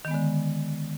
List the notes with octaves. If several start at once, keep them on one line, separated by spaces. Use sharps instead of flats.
D3 D#3 G#3 B3